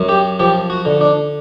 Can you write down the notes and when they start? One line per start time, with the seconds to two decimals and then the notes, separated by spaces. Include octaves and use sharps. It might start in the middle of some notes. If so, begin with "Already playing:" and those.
Already playing: F#2
0.09 G4
0.40 F3 G4
0.70 F#4
0.85 D3
1.01 D4